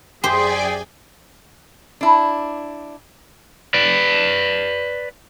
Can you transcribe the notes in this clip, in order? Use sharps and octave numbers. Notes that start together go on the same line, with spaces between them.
F#2 G4 G#4 C5 D5 E5 G5 G#5
D4 E4
B4 D5